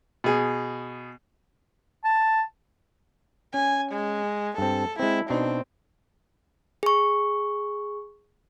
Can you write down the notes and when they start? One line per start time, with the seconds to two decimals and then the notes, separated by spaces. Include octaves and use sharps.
0.24 B2 G#4
2.04 A5
3.54 C#4 G#5
3.93 G#3
4.58 G2 C4 A4
5.00 G#3 C4 E4
5.30 B2 C4 D4 D#4
6.83 G#4 C#6